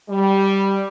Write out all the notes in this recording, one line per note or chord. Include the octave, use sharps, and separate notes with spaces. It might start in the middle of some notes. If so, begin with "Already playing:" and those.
G3